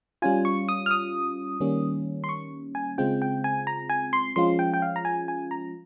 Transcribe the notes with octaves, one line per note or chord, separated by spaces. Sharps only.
G3 C#4 F4 G#5
C#6
D#6
F6
D#6
D#3 G3 A#3 C#4
C6
C#6
G#5
C#3 G#3 C4 F4 G5
G5
G#5
A#5
G#5
C6
F3 G#3 C#4 F4 C6
G5
G5
F5
A#5
G#5
G#5
A#5